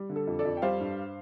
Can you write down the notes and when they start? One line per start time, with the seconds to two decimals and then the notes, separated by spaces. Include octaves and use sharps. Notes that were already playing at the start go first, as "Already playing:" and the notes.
Already playing: G3
0.10 D3
0.16 A4
0.27 F2
0.39 A4 D5
0.45 F2
0.57 G5
0.62 G3 C5 F5
0.80 G2